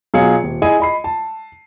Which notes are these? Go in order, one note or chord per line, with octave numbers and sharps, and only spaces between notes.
B2 F#3 F4 G#4 F5 C#7
D#1
E4 G#4 D#5 G#5 D#7
D#5 B5 C7
A5